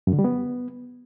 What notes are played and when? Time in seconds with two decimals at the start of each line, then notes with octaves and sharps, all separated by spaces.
0.07 F#2
0.13 D3
0.19 G3
0.24 B3